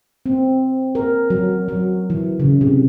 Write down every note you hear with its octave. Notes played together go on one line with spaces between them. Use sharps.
C4
A#4
F#3
F#3
E3
C#3
C3